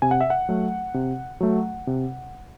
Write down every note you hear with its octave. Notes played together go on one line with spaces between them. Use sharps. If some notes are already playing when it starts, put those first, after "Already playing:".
C3 G#5
F#5
E5
F#5
F#3 A3
C3
F#3 A3
C3